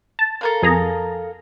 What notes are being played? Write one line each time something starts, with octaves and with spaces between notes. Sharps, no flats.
A5
A4 A#4 F5
F2 G#4 A#5